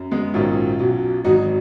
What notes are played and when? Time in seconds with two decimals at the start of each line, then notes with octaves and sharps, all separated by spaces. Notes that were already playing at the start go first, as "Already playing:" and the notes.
Already playing: F#2
0.11 G#3 B3
0.34 A#1 G#2 D#3 F#3 C#4 F4
0.79 B1 B2 F#3
1.24 G#1 G#2 F#3 D#4 F#4